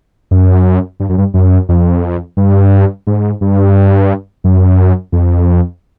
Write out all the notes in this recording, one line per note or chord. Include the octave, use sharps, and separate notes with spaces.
F#2
G2
F#2
G2
F#2
F2
G2
G#2
G2
F#2
F2